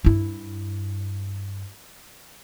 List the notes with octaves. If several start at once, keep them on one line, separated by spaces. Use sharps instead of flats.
G2 E4